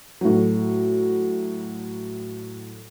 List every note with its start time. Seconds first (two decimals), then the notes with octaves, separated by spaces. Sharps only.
0.21 A2 F#3